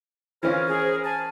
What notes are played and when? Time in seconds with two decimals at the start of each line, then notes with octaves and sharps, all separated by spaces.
0.43 E3 C#4 F4 A#4 C5
0.68 G#4
1.04 G#5 A5